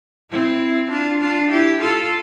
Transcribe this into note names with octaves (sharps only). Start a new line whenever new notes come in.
C4 E4
D4 F4
D4 F4
E4 G4
F4 A4